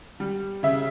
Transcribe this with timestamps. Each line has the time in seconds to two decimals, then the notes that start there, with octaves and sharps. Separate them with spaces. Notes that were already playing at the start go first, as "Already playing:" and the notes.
0.20 G3
0.63 C#3 E5